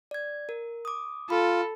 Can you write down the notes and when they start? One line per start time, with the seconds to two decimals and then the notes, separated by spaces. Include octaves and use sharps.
0.11 D5 G#6
0.49 A#4
0.85 D6 D#6
1.30 F4 A4 B5